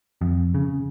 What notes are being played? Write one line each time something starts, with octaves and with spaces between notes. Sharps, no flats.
F2
C#3